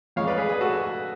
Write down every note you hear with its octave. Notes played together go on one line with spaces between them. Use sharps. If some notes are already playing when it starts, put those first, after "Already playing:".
F2 F3 G#3 C#5 F5
B4 D5
G#4 B4
G#4 B4
F#4 A4